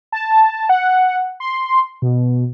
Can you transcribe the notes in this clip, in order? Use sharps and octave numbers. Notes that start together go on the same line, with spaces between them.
A5
F#5
C6
B2